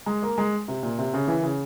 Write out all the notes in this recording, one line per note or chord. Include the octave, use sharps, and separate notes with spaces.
G#3
A#3
G#3
C3
A#2
C3
C#3
E3
C#3